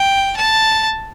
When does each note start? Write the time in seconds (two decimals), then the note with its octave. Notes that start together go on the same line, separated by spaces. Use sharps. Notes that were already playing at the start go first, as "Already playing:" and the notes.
Already playing: G5
0.37 A5